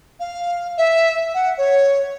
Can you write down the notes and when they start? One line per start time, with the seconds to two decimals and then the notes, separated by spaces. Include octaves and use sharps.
0.20 F5
0.78 E5
1.34 F#5
1.58 C#5